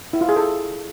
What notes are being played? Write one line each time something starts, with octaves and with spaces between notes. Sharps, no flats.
E4
F4
G#4
A4